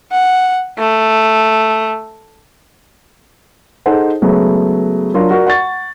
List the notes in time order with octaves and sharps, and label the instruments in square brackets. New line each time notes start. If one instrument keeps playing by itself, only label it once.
[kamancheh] F#5
A3
[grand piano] D#4 G#4 A4 C5 F#5
C#3 F#3 G#3 A3 B3
F#3 D4 F4 A#4
F#4 A#4 D5
F#5 C#6 A6